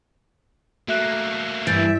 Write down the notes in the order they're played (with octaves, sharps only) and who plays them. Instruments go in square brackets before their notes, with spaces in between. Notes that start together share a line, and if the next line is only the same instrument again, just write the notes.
[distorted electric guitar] A3 A#3 [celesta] F#4 E5 F#6
[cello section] G2 E5 [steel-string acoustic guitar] E3 [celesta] G6 A6 D7